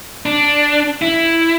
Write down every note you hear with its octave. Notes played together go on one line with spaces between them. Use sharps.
D4
E4